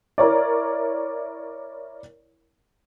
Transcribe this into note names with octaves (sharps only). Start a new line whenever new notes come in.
E4 A#4 C#5 D5